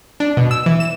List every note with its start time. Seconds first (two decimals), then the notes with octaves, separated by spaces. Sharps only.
0.20 D4
0.37 B2
0.51 E6
0.66 E3
0.80 E7